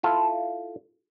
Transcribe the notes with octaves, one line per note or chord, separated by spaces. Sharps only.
E4 F4 A4 F5